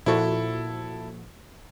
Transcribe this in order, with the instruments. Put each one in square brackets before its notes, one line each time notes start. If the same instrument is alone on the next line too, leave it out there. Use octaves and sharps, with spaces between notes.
[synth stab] A#2 F3 F#4 [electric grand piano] E4 A4